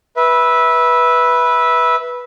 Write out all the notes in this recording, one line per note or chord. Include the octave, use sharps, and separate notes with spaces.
B4 E5